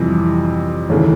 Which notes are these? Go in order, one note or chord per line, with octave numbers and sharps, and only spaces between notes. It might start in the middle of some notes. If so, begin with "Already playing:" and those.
Already playing: F2 C3 E3 G3
D#2 C#3 E3 A3